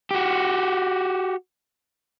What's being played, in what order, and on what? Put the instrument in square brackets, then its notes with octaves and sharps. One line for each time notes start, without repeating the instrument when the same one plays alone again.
[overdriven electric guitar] F#4 G4